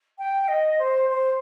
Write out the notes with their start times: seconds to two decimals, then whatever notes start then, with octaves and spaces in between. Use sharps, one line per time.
0.18 G5
0.48 D#5
0.79 C5
1.09 C5